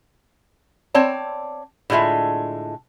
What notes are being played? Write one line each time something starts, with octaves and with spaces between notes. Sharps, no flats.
C4 C#5 D5 A5
A2 D3 G#3 F4 E5